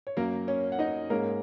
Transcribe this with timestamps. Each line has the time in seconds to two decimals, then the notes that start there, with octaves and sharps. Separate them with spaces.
0.07 C#5
0.17 F#2 F#3 A#3 A#4
0.48 C#4 C#5
0.72 F#5
0.79 D#4 D#5
1.10 G#2 G#3 A#3 C#4 A#4